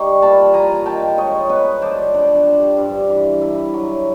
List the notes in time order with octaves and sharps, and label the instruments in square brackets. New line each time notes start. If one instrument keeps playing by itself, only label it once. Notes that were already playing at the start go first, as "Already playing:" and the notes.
Already playing: [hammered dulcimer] G3 D#4 C#6
A#2 A5 B5
F3 G#5 A#5
D#3 G5 A5
G#3 C#5 D#5
B3 B4 C#5
F3 C5 D5
D4 C5 D5
G3
G2
E3
E4
F#3